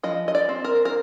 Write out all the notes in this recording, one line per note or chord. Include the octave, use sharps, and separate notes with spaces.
F3 D#5
D#5
D5
C4
A#4
A#4